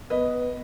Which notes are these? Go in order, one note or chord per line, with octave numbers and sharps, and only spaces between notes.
B3 B4 D#5